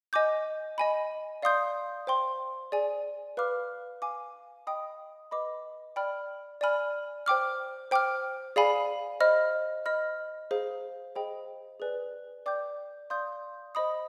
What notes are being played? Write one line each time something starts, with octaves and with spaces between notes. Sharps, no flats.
D#5 G#5 D6 G6
D#5 G#5 B5
D5 F5 C6 D#6 G6
C5 G5 C6
G#4 D5 G#5
B4 F5 B5 D6 F6
F5 G#5 D6
D#5 G5 B5 D#6
B4 D#5 B5 D6
D5 G5 B5 F6
D5 G#5 B5 F6
C5 G5 D6 F6
C5 G5 D6 F6
G#4 D5 F5 G#5 B5
C5 D#5 B5 F6
D#5 B5 F6
G#4 C5 F5
G#4 C5 D#5 G5 B5
G#4 B4 D5 G#5
D5 G5 D6 G6
D5 F5 C6 D#6 G6
C5 D#5 B5 D#6